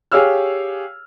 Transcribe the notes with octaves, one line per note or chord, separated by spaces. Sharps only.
G4 G#4 C#5 F5 E6 F6